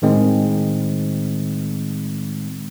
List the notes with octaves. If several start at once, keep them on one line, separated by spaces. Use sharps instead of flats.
A2 D#3 G#3 C4